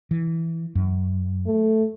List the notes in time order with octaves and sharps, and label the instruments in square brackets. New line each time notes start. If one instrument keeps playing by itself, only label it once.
[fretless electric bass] E3
F#2
[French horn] A3